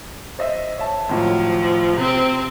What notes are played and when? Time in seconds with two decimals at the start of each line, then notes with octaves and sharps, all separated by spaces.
0.39 C5 D#5 E5
0.78 C#5 E5 A5
1.09 G#1 A2 F3 F#3
1.97 C3 C4